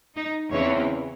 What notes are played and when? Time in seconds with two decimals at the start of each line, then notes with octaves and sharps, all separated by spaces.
0.16 D#4
0.52 E2 C#3 E3 C4 C#5